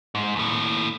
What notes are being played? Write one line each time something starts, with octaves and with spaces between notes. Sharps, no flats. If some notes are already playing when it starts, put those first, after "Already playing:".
G#2
D#2 A2